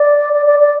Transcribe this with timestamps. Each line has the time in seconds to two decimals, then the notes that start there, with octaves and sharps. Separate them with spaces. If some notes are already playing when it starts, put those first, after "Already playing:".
Already playing: D5
0.33 D5
0.46 D5
0.60 D5